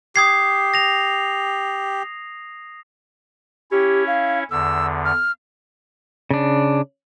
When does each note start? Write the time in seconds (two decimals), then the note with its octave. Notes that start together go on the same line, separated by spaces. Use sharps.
0.16 G4 D#6 G#6 C7
0.74 A#6 F7
3.71 C#4 E4 G4 C#5
4.07 F5
4.51 E2 D3 E6
5.05 F6
6.31 C#3 D4